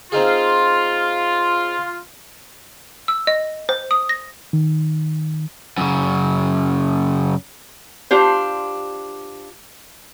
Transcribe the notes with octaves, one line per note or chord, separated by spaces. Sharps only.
C4 D#4 F4 G#4
E6
D#5
C5
D#6
A#6
D#3
F#2 C#3
D4 F4 G4 C5